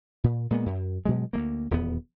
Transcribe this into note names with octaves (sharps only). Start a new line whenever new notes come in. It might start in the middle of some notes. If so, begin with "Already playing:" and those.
A#2
A#2 G#3 A#3 B3
F#2
G2 B2 F#3 G#3
D2 A3 A#3
D#1 E2 B3